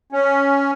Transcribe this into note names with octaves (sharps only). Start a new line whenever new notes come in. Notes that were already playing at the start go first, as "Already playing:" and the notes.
C#4